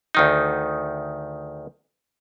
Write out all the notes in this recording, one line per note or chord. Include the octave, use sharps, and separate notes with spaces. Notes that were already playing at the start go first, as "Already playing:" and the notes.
D2 D#3 D#4